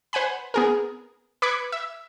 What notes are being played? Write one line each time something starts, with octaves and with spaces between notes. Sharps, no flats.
B4 C5 F#5 G#5 B5
B3 G#4 A#4
B4 D6 G#6 B6 C#7
E5